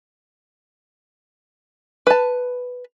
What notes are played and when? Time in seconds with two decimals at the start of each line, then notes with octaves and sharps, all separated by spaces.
2.07 B4 A5